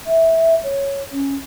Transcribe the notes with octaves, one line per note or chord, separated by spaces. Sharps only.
E5
C#5
C#4